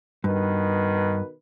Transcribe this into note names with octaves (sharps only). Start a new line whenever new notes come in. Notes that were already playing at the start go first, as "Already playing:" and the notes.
G2 B2 D#3 B4